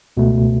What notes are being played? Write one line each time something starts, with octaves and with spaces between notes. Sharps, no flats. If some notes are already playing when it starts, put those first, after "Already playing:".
C#2 B2 A3